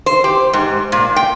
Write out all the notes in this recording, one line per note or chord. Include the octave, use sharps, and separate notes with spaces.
C5
G4
G#2
A#2
G5